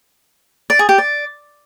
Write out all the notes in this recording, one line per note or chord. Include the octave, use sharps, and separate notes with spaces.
D5
G#4
G4
D5